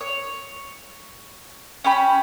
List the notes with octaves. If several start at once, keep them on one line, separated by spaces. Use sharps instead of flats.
C#5
C#4 G4 B5